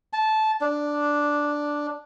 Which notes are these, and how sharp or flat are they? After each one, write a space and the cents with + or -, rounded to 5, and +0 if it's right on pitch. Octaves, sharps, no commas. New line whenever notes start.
A5 -15
D4 +0